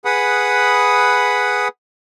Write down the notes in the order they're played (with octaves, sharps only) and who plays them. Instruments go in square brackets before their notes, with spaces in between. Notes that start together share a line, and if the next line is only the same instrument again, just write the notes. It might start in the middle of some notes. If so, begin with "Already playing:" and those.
[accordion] G#4 B4 F#5 B5 D#6